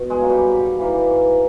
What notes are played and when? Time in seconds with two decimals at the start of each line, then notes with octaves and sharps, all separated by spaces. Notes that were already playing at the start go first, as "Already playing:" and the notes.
Already playing: B2
0.10 G#3 G#4
0.20 F#3 A#3
0.29 G3 G4
0.49 G#2
0.78 E3 G3 A#3
1.08 G#2